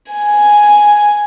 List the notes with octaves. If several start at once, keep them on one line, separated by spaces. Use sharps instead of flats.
G#5